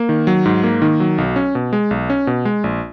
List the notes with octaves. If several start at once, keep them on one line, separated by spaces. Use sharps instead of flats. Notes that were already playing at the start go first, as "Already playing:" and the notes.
Already playing: A#3
D#3
F#3
G#2
A#3
D#3
F#3
B1
C#4
B2
G#3
B1
C#4
B2
G#3
A#1